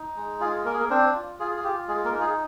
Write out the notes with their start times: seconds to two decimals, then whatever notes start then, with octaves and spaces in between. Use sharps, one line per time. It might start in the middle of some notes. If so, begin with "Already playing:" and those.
Already playing: D#4
0.16 G#3
0.40 F4 G#4
0.65 A#3 A#4
0.74 G#4
0.80 A#3 A#4
0.90 C4 D4 C5
1.15 F4
1.40 F4 G#4
1.56 G#4
1.64 F4 G4
1.88 G#3 G#4
2.05 A#3 A#4
2.13 D#4
2.21 G#4